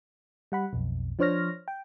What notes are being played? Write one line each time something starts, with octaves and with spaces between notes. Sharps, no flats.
G3 F#5 B5
B1 F2
F3 D4 C5 C#5 F6 A#6
G5